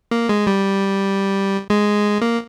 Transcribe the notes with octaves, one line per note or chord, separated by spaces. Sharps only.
A#3
G#3
G3
G#3
A#3